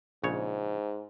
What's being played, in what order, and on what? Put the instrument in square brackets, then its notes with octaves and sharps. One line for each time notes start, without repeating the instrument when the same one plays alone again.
[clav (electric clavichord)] A#1 C#3 C#5 [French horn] G#2